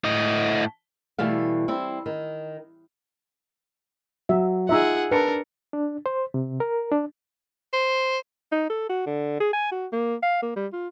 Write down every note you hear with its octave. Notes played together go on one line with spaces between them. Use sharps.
A2 D#5
B2 E3 G3 A3 F5
G3 C4 E4
D#3
F#3 E5
D#4 F4 G#4 E5 F#5 A#5 E6
D4 A#4 B4 A5 C#7
D4
C5
C3
A#4
D4
C5
D#4
A4
F#4
D3
G#4
G#5
F#4
A#3
F5
A#3
G3
F4